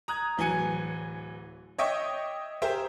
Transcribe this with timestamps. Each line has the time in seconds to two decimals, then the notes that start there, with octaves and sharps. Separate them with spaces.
0.08 A#5 D#6 F#6 G#6
0.37 D1 E3 F#3 G#5 C#7
1.78 C#5 D#5 E5 G5 C#6 D6
2.62 G4 G#4 A#4 C5 E5 G5